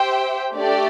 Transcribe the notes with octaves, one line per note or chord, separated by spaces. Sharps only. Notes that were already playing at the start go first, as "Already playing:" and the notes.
Already playing: G4 C5 E5 G5
A3 D4 G4 D5